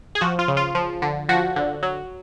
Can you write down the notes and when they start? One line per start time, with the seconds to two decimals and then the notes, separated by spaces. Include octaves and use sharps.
0.15 G#4
0.21 F3 F#4
0.39 F4
0.48 C#3
0.57 F4
0.75 F3
1.02 D3
1.29 F3 F#4
1.56 D3
1.83 F#3